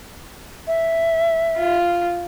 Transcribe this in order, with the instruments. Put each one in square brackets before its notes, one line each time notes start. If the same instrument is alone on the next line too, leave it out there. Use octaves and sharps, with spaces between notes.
[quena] E5
[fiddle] F4